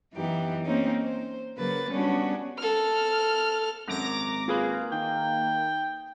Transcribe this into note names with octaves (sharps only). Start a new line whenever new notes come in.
F#2 E3 B3 D#4 G4
A#3 C4 C#4 D#4
C5
C#3 F#3 A#3 B4 A6
G3 B3 C#4 D4 F#4
A4 F6
G#1 F#2 A#5 D6 A#6
A#3 F4 G#4 B4
D#3 G5